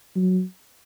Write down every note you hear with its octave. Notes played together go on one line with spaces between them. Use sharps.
F#3